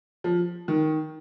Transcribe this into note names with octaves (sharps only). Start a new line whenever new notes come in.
F3
D#3